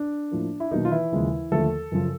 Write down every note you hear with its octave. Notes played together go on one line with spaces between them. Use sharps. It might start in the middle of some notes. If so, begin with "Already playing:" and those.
Already playing: D4
A2 F3 A#3
E4
B2 D#3 F#3 A#3 D#4
F4
E3 E4
D#2 C#3 F3 G#3
D#2 D3 F3 A3 A4
F#2 C#3 F3